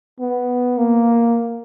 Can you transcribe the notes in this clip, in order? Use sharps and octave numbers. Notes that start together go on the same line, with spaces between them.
B3
A#3